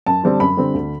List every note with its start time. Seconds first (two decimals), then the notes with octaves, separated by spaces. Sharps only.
0.06 F#2 A5
0.24 D3 G3 C4
0.40 F#2 B5
0.57 D3 G3 C4
0.74 D2